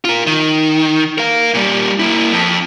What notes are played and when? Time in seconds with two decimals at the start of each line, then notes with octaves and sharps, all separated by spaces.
0.05 F4 A#4
0.27 D#3
1.18 A#4 F5
1.54 A#2 G3
2.00 A#3 E4
2.32 F2